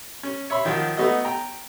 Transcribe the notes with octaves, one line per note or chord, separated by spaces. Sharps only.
C#4
C#5 E5 B5 C6
D#3 F3 F#3
A3 B3 D#4 F#4 D#5
G5 A#5